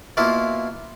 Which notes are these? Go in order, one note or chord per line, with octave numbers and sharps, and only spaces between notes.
B2 A#3 E4 F4